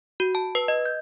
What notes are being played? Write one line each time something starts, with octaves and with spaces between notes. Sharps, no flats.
F#4
A5
B4
D#5
G6